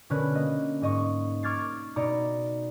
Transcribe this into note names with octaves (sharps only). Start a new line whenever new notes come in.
B2 D3 C#4 A#4 B4 F#6
A#3 D#5
G#2 D#5 C#6
C#6 D6 F6 G#6 A6 C7
B2 D#4 D5 A#5 C#7